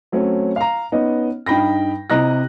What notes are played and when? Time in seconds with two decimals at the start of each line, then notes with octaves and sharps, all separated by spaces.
0.12 F#3 A3 C4 C#4
0.56 F5 A#5
0.92 B3 C#4 D#4 D#5
1.46 G2 D#4 G5 B5 A#6
2.10 C3 E4 D#5 A#5 F#6 A#6